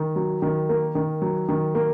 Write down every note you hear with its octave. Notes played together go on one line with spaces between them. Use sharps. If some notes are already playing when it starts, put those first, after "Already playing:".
Already playing: D#3
F#3
D#3
A#3
D#3
F#3
D#3
A#3